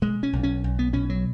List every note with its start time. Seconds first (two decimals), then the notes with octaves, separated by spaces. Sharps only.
0.02 B2 G#3
0.23 C#4
0.33 B1
0.43 C#4
0.64 B1
0.79 B3
0.93 B2 C#4
1.10 F#3